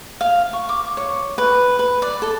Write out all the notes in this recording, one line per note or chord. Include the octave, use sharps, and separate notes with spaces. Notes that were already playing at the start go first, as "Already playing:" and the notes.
F5
C#6
D6
C#5
B4
B4
D5
A4